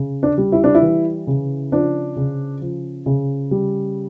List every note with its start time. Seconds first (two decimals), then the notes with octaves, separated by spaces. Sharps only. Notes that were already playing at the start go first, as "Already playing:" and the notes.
Already playing: C#3
0.23 D4
0.38 G3
0.52 E4
0.64 D4
0.75 E4
0.82 E3
1.27 C#3
1.72 F3 D4
2.16 C#3
2.61 F3
3.06 C#3
3.51 G3